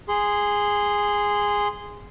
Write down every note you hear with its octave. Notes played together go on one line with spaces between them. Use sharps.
G#4 C6